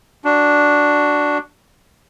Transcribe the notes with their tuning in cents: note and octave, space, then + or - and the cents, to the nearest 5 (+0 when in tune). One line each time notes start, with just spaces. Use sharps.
D4 +0 F#4 +5